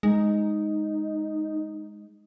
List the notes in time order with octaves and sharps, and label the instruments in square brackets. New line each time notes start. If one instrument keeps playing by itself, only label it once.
[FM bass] G#3 [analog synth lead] D#4